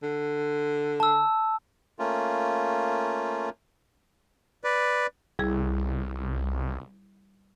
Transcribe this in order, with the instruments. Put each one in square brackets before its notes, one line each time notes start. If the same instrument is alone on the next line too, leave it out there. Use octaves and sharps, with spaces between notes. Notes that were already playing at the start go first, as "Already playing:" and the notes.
[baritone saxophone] D3
[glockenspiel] A5 E6
[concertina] A3 A#3 C#4 F4
[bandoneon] B4 D5
[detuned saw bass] C2 [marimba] G3 E4 G#4